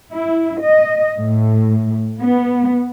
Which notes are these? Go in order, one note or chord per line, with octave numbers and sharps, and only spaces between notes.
E4
D#5
A2
B3